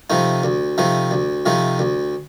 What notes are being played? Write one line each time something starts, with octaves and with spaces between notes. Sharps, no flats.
C3 F3 A3 D#4
D2
C3 F3 A3 D#4
D2
C3 F3 A3 D#4
D2